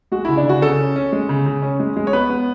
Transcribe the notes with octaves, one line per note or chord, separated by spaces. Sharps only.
G#3 F#4
C#3 E4
D4
C#3 F#4
C#3 A4
C#4
C#4
G#3
C#3
C#3
C#4
G#3
G#3
C#5
B3 B4
B3